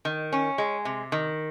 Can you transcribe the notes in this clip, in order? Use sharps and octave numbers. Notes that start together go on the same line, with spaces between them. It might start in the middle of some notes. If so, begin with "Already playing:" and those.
D#3
C#4
G#3
C3
D#3